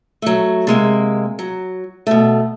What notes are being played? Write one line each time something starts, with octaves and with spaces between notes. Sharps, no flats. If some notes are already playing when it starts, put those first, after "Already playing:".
F#3 A3
C3 G#3 A#3
F#3
B2 A3